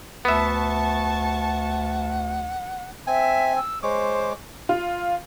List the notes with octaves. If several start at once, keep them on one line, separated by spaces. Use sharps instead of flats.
D2 B3 E5 F#5 A5 C#6
C4 E5 G#5
E6
G#3 C5 C#5 D6
F4